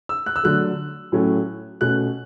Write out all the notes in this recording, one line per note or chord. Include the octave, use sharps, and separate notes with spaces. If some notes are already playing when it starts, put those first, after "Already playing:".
E6
F#6
E6
D3 F#3 A3 F#6
A2 F#3 A3 C#4
B2 A3 C#4 F#6